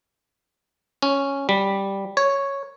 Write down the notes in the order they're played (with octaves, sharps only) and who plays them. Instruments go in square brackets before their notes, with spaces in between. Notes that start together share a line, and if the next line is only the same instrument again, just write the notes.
[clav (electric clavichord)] C#4
G3
C#5